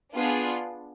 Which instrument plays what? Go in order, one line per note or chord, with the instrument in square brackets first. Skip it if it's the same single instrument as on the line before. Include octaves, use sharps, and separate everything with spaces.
[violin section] B3 D4 F4 G#4